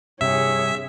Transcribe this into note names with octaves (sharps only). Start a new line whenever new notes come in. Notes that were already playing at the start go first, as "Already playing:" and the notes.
G2 C3 G#4 C#5 E5